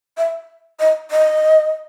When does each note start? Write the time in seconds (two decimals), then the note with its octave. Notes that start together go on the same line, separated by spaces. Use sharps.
0.17 E5
0.79 D#5
1.11 D#5